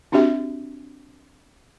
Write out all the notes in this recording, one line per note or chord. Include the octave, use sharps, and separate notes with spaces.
C4 D4 F#4 G4 E5